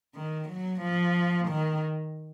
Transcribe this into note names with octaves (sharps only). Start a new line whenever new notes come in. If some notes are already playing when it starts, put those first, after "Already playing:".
D#3
F#3
F3
D#3